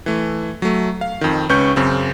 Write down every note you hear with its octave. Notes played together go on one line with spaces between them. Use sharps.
E3 A3
F#3 A3
F5
F2 D#3
C#2 C#4 B4 C#6 G6
F#2 C#3 C4